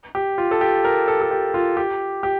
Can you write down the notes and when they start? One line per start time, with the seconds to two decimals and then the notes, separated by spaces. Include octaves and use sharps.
0.15 G4
0.38 F4
0.51 A4
0.61 G4
0.84 A#4
1.08 A4
1.21 A4
1.31 G4
1.54 F4
1.77 G4
2.23 G4